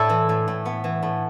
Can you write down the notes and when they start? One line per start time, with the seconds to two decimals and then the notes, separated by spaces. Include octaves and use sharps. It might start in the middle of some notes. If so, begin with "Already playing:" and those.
Already playing: A2 A3 E4 A4 D5
0.09 E3
0.29 A2
0.48 A2
0.66 B3
0.84 E3
1.03 A2